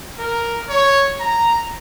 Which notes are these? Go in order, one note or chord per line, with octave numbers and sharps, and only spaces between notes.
A#4
C#5
A#5